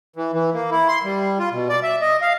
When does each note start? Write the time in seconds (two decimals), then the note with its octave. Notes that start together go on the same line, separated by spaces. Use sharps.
0.16 E3
0.33 E3
0.54 A#3
0.71 E4
0.88 C6
1.04 G3
1.39 F4
1.52 B2
1.69 D5
1.83 E5
2.01 D#5
2.22 F5